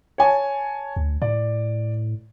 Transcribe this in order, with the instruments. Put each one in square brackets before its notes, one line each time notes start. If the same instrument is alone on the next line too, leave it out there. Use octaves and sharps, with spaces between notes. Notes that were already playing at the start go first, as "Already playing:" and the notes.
[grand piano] C#5 G#5 A5
[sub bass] D2
[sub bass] A2 [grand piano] D5